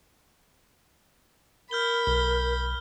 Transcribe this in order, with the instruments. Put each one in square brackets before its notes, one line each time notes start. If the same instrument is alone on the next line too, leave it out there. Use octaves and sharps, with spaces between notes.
[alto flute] A#4 [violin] B5 [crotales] F6 G6 G7
[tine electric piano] B1 [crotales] G7